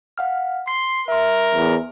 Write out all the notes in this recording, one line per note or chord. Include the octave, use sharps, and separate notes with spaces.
F5 F#5 F6
C6 C7
A#4 E5 C6
E2